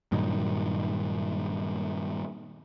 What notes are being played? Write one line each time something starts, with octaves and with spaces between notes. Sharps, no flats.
G2 A#2 D#3 F#3